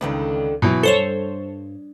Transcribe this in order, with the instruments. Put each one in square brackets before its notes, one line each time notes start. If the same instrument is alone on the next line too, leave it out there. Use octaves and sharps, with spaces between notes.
[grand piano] C#2 [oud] D3 D#3 B4
[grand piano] B2 E3 F#3
[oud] G2 [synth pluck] A4 C5 C#5 [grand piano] G7